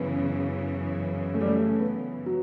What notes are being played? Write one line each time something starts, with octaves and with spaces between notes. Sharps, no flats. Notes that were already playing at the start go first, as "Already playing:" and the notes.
Already playing: F#2 C#3 E3 B3
A3
G3
A3
B3
F#3